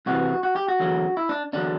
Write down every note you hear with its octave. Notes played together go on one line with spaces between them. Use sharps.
C2 C3 E3 F#4
F#4
G4
F#4
E2 D3 F#3
E4
D4
E2 D3 F#3 D4